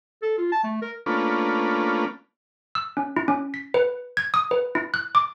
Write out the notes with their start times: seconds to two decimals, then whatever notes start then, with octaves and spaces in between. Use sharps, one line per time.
0.22 A4
0.38 F4
0.52 A5
0.64 A3
0.82 A#4
1.06 A3 A#3 C#4 D4 F4 B4
2.75 E6
2.97 C#4
3.17 E4
3.28 C#4
3.54 B6
3.74 B4
4.17 G#6
4.34 D#6
4.51 B4
4.75 E4
4.94 F#6
5.15 D6